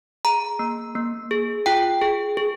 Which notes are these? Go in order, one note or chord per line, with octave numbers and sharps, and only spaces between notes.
G#4 A#5
A#3
A#3
G#4
F4 G5
G#4
G#4